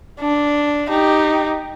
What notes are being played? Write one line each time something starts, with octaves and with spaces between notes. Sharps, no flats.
D4
D#4 G4